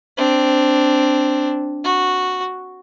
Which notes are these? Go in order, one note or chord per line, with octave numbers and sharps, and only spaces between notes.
C4 D4
F#4